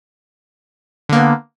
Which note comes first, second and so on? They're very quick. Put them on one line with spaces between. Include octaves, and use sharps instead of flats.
D3 A#3 B3